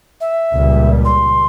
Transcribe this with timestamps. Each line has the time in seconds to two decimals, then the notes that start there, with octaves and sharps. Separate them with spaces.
0.20 E5
0.52 C#2 A#2 G3
1.05 C6